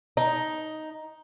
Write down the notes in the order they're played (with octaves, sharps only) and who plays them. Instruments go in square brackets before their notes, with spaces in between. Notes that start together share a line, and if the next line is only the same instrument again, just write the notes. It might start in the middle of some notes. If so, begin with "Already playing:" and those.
[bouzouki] D#4